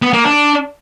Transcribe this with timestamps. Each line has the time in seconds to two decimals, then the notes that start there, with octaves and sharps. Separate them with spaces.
0.02 B3
0.13 A#3
0.24 D4